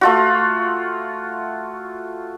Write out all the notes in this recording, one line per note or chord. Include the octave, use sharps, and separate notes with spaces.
A3 F4 F#4